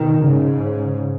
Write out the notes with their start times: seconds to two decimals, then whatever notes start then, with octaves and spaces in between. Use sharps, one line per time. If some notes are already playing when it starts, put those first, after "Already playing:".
Already playing: B2 D#3
0.23 G#2 C#3